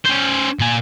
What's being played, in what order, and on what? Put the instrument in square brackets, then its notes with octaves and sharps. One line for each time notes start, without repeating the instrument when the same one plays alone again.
[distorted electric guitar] C#4 C5
A#2 G#5